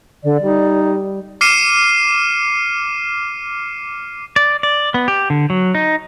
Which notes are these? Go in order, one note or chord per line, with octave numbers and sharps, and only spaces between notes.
D3 D5
G3 D#4
D6 F6 C7 C#7 D#7 E7
D5
D5
B3
G4
D3
F#3
D#4